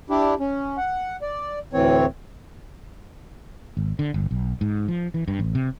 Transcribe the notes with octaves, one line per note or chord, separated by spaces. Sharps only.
D4 E4 G4
C#4
F#5
D5
D2 A2 E3 C4 C#5
G#1
D3
G1
B1
G#2
F3
E3
G2
A1
C3